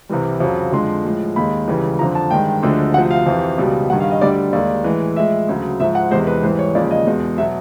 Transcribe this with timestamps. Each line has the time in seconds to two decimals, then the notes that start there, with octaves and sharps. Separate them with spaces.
0.09 C2 C3 E3 G3
0.40 F2 C#3 F#3
0.72 F2 D3 F3 G#3 C6
1.04 A2 F3 G#3
1.36 D#2 D#3 G#3 B5
1.68 C#2 C#3 E3 G3
1.99 F2 D3 F3 A#5
2.15 A5
2.31 G2 D#3 G#3 G5
2.63 D2 D3 F3 G#3
2.94 D2 C3 F3 F#5
3.11 F5
3.26 F2 C3 E3
3.58 C#2 B2 G3
3.89 G2 D#3 G3 F#5
4.00 F5
4.11 D#5
4.21 D2 D3 G3 D5
4.53 D#2 D#3 G#3 D5
4.84 A2 E3 G#3
5.16 A2 F3 G#3 E5
5.49 D2 C#3 F#3
5.80 G#2 F3 G#3 E5
5.95 F#5
6.11 E2 C3 E3 G#3 C5
6.27 B4
6.43 G#2 E3 G3 C5
6.59 C#5
6.75 D#2 C#3 F3 G#3 D5
6.91 D#5
7.07 E2 B2 G#3
7.38 B2 F#3 E5